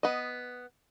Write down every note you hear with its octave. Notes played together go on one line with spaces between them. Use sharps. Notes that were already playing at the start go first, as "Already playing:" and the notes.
B3 D#5